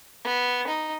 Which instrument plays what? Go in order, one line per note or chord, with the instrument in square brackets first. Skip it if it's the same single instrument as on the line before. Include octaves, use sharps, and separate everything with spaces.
[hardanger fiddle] B3
D#4